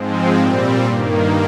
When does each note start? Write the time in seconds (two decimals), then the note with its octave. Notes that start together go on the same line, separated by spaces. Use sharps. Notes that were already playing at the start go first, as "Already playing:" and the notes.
Already playing: G#2 F3 G#3 C4
0.38 A#2 G3 C4
0.85 G2 D#3 A#3